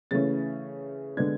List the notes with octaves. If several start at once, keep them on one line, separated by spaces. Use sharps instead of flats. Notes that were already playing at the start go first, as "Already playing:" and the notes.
C#3 E3 A3 C#4 A6
D3 G#3 B3 D4 G#6